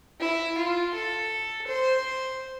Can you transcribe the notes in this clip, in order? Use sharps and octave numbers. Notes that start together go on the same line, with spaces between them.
E4
F4
A4
C5